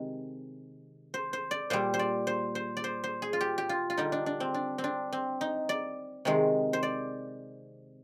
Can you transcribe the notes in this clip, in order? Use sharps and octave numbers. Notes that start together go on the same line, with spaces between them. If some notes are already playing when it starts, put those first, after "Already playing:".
Already playing: C3 D#3 G#3
C5
C5
D5
A#2 G3 C5
C5
D5
C5
C5
D5
C5
C5
G#4
F4
G4
G4
F4
F4
D3 G3 D#4
D4
D4
C4
D4
C4
D4
C4
D#4
D5
C3 D#3 G#3
C5
D5